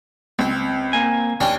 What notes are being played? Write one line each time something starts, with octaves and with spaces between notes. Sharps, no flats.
C#2 C4
A#3 G#5
D#2 C#4 D4 G5